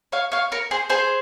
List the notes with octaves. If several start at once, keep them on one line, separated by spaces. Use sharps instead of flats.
C#5 F5
C#5 F5
A#4 C#5
G#4 C5
G#4 C5